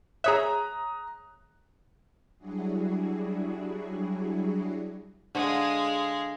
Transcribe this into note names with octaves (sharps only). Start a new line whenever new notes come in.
G#4 C#5 E5 A#5 D#6 F#6
F#3 G3 D4 E4 F#4 G#4
D3 G#3 F5